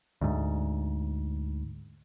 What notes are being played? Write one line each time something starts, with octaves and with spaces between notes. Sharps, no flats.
D2 G#2